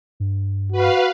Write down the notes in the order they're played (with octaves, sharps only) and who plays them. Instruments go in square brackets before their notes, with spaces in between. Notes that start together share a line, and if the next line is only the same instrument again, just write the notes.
[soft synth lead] G2
[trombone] F#4 [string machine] B4 F5